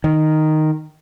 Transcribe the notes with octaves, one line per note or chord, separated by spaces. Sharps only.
D#3